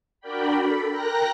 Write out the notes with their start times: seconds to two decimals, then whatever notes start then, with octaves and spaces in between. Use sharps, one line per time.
0.20 D4 F#4 A#4 D5 G5 B5
0.58 A4 B5
0.91 A#4 G5 A#5 F#6 A#6